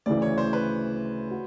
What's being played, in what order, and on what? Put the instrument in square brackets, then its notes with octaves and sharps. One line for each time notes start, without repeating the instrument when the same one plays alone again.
[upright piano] D2 C#3 E3 [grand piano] D5
[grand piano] C#5
C5
B4
[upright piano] F#4